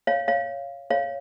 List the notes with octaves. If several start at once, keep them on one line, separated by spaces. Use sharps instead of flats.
C#5 F5
C#5 F5
C#5 F5